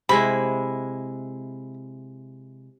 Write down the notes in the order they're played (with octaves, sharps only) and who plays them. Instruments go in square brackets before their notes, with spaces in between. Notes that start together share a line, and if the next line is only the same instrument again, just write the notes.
[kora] C3 G#3 E4 [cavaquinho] B5